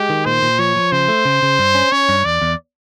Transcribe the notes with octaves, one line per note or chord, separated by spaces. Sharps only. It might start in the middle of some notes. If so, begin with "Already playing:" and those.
Already playing: G#3 G4
D#3
A#2 C5
A#2
F3 C#5
F3
C#3 C5
A3
C#3
C#3
G2
C#4
C#4 C#5
G2
E2 D5
E2